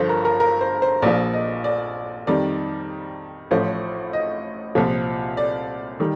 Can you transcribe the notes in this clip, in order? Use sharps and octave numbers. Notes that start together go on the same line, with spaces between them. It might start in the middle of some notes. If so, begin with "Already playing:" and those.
Already playing: G1 G2 F3 A4 C5
A#4
A#4
A#4
C5
C5
A#1 A#2 F3 D5
D#5
D5
F2 D#3 G3 D5
A1 A2 F3 C5
D#5
C2 A#2 F3
D5
D#3 G3